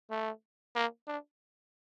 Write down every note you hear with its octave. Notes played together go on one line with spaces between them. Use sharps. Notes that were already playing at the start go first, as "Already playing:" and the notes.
A3
A#3
D4